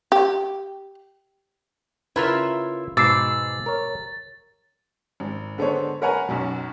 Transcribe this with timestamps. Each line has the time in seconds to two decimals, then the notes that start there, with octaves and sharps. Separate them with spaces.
0.12 G4
2.16 C#3 E4 F4 A#4 B4 E5
2.97 G#2 B2 D6 E6 A6 C7
3.66 A#4 C#5
5.20 G#1
5.58 D3 G#3 B3 A4 C5 C#5
6.02 A#4 B4 C#5 F#5 G#5 A#5
6.29 B1 F#2 B2